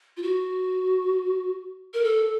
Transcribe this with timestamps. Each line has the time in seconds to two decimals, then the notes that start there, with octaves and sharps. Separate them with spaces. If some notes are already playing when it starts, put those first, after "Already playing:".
0.17 F4
0.23 F#4
1.94 A#4
2.04 A4